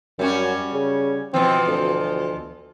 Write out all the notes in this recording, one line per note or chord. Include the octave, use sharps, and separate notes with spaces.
F#2 G3 C#4 F#4
C#3
B2 E3 F3 C4
D2